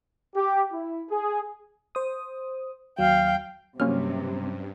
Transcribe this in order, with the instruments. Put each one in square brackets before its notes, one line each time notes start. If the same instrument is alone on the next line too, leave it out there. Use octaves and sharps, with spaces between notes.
[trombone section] G4
E4
G#4
[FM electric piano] C5 D#6
[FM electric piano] D#2 F#3 [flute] F5 [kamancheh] G5
[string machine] G2 [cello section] C3 [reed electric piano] F#3 C#4 [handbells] A#3 F6